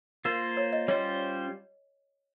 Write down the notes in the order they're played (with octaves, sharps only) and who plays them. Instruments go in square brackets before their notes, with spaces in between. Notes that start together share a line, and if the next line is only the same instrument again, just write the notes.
[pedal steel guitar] A#3 F4 C5 [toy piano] A#4
[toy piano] C#5
D#5
[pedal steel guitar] G3 C#4 F4 C5 [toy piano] C#5